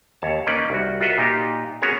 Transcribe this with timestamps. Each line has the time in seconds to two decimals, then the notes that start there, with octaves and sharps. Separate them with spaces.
0.22 D#2 C#5 A5
0.47 A#3 C#4 D#4 B4 D5 D#5
0.70 C2 F#4
1.01 F4 F#4 A#4 B4 D#5 E5
1.18 A#2 D#4 F4 G4
1.82 B3 C#4 F#4 G#4 A#4 C#5